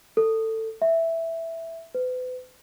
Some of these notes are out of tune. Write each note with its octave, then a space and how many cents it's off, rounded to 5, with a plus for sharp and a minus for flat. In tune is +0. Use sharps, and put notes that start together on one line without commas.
A4 +20
E5 +0
B4 +40